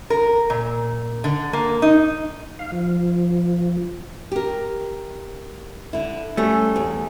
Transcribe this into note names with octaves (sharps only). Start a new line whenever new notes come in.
A#4
A#2
D3
A#3
D#4
F5
F3
G4 A#4
D3 E4
G3 A3 C#4
E2